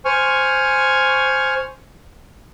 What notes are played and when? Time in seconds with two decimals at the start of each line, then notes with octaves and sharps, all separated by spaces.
0.05 C5 G#5 C#6 F6